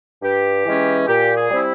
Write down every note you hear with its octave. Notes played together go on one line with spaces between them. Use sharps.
G2 G4
E3 G#3 C#4
A#2 G4
G#4
G3 C4 E4